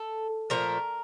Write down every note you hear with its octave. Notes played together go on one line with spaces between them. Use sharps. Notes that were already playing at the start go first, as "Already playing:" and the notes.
Already playing: A4
A#2 F3 A3 A#4